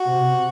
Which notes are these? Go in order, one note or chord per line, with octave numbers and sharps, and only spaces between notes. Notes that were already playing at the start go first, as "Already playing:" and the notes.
Already playing: F#4
C3